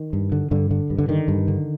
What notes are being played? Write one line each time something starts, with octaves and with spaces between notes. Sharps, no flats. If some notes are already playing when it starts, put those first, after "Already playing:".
Already playing: D#3
G2
D3
G2 D3
D3
G2
D3
D3 D#3
G2
D3